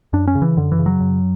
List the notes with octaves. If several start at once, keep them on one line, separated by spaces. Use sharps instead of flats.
F#2 D4
C#4
C#3
E3
F#2 D3
E3
C#3
F#3
F#2